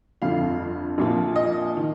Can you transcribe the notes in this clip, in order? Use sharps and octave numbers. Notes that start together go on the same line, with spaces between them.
G1 F2 D3 F3 F5
A#1 A#2 F3
D#5
D#3